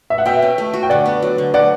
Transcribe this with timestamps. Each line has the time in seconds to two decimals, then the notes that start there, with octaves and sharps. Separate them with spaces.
0.10 E5
0.18 F#5
0.26 B2 E5 G5
0.42 C#4
0.58 A3
0.74 F#4
0.83 G5
0.90 D3 D5 F#5
1.06 B3
1.23 F#3
1.38 D3
1.54 D3 D5 F#5